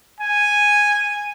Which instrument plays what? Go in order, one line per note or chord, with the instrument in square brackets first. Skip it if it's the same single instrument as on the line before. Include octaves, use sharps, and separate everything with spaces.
[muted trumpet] G#5